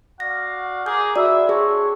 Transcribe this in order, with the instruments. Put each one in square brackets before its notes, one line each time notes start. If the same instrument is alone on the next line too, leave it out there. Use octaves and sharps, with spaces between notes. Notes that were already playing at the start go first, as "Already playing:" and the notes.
[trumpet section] F#4 D5 F5 [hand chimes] A#6
[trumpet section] G#4 A#4 D6 [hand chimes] G6
[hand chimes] F#4 D5 [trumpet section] B4 E5
[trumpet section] C4 D4 C#5 [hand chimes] G#4